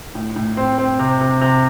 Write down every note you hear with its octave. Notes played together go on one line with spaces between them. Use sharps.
A2
A2
C4
C4
C3
C3
C3